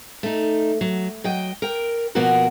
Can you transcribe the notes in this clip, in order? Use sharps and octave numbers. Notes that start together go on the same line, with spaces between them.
A3 D#4
F#3
F#3 D#5 G5
A#4 G5
B2 F3 A#3 B3 F#4 A#4